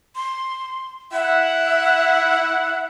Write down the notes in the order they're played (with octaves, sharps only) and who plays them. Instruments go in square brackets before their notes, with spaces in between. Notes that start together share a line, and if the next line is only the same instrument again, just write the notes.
[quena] C6
[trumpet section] E4 F#5 [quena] E5